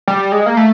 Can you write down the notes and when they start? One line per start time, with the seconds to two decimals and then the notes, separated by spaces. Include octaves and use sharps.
0.08 G3
0.32 G#3
0.46 A#3
0.57 A3